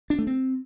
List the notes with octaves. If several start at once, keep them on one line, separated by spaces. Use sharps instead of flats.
D4
A3
C4